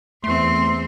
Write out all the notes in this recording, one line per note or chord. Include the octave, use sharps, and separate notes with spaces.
E2 A3 C4 C6